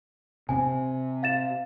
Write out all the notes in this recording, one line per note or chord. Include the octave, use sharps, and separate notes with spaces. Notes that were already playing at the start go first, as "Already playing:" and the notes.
C3 C4 G#5
F5 A6 E7